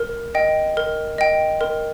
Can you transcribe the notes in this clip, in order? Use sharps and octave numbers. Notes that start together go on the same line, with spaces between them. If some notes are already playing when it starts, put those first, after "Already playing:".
Already playing: A#4
D#5 G5
A#4
D#5 G5
A#4